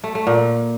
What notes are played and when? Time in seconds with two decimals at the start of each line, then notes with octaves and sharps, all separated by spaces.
0.04 A3
0.15 A3
0.27 A#2